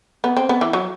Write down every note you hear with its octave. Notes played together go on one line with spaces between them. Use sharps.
B3
C4
B3
E3
F#3